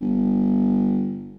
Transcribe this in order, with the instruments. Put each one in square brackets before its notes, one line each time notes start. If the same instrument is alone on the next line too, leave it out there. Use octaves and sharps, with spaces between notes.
[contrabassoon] G1